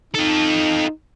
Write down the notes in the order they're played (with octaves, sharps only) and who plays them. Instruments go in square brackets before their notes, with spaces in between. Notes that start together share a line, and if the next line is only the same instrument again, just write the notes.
[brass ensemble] D#4 [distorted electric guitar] F4 A4